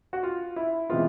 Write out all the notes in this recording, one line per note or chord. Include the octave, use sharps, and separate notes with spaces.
F#4
F4
E4
C3 E3 G#3 B3 F4